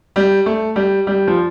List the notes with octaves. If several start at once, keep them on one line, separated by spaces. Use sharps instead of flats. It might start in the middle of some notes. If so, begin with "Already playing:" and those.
G3
A3
G3
G3
F3